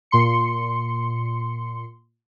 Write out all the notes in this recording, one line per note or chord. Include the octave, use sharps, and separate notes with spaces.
A#2 C6 C#7